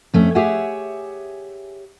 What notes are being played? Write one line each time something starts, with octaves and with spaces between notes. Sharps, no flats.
F2 A3 C#4
G4 G#4 C#5 E5 F#5 G#5